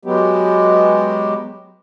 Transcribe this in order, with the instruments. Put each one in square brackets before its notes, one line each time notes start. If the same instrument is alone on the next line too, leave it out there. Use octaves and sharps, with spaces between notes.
[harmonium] F#3 G#3 B3 G4